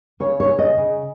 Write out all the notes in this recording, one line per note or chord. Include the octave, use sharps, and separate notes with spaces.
C#3 C#5
C#5
C#3
D#5
C#3